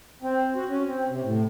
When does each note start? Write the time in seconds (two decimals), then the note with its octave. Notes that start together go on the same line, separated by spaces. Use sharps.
0.22 C4
0.55 F#4
0.69 C#4
0.86 C4
1.09 C3
1.23 A2